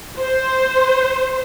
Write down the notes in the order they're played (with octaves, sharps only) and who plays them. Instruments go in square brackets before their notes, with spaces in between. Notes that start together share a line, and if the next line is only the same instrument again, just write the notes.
[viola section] C5